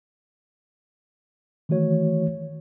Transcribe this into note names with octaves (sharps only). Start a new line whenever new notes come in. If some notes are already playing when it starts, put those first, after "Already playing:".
D#3 E3 A3 F#4 C#5